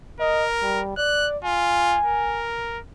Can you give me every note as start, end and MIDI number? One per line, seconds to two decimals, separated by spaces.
0.20 0.81 70
0.20 0.46 75
0.63 0.95 55
0.97 1.38 74
0.97 1.28 90
1.44 1.98 65
1.44 2.47 80
2.05 2.79 70